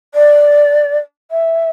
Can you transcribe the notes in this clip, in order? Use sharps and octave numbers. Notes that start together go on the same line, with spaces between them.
D5
E5